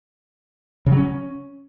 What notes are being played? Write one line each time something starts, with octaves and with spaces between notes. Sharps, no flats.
C#3
F#3
C#4